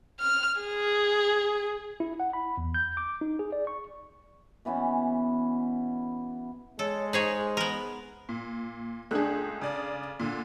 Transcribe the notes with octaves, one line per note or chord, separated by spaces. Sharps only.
F6
G#4
E4
F#5
B5
E2
G6
D6
D#4
G#4
D5
C#6
B2 E3 B3 C#4
G#3 A4 C#5
D#4 G#4 C5 C#5
B3 A#4
A#2
C#2 A3 D4 G#4 F#6
C#3 D5
A#2 D3